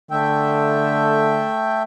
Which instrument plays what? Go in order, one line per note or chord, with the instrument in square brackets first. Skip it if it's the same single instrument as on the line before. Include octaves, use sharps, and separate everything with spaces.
[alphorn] D3 [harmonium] A3 E5 G5